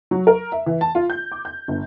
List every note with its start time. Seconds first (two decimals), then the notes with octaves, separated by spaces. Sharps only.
0.11 F#3
0.27 A#4
0.52 E5
0.66 E3
0.81 A5
0.95 F4
1.10 G6
1.32 D6
1.45 G6
1.68 G1